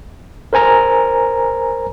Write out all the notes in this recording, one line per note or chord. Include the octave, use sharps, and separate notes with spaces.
A#4 C5 G#5 A#5